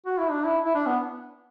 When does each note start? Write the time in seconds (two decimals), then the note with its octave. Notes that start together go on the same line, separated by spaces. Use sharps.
0.06 F#4
0.18 E4
0.30 D4
0.44 E4
0.64 E4
0.75 D4
0.86 B3